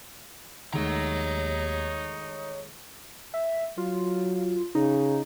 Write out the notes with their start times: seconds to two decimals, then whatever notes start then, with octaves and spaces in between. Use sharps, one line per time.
0.73 D#2 D#3 G#3 A3 D#4 C#5 A#5
3.34 E5
3.78 F#3 F4
4.75 C#3 D#4